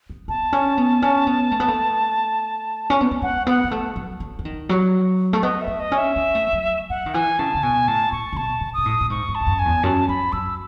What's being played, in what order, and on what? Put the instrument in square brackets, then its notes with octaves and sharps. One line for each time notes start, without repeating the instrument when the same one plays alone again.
[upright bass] B3
[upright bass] B3 [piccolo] A5
[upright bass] C#4
B3
C#4
B3
A3
B3
A3
C#4
B3
A3
[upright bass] G#3 [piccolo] F#5
[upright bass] B3 [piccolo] F#5
[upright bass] G#3
A3
F#3
F#3
E3
D#3
F#3
A3
[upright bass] B3 [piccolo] D#5
[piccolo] E5
[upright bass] B3
[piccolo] D#5
[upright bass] C#4
[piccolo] E5
[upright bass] B3
A3
F#3
[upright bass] F#3 [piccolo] F#5
[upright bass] D#3
[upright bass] E3 [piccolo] G#5
[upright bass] C#3 [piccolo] A5
[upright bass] C#3
[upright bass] B2 [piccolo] G#5
[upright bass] A2 [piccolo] A5
[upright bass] A2 [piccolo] C#6
[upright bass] C#3
[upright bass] B2 [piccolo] A5
[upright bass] B2
[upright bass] B2 [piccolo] D#6
[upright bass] A2
A2
[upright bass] G#2 [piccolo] C#6
[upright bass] G#2
[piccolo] A5
[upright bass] E2
F#2
[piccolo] G#5
[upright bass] E2
[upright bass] F#2 [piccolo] A5
[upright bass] F#2 [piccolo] B5
[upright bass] F#2 [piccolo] E6